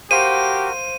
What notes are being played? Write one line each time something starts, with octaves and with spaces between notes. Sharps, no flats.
F#4 G4 A#4 C5 F5 C6 D#7